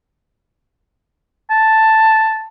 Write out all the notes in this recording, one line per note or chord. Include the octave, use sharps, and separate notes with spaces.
A5